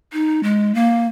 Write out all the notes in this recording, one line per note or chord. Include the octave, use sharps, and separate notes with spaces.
D#4
G#3
A#3